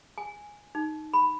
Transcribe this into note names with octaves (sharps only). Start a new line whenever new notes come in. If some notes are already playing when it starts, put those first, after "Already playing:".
G#5
D#4
B5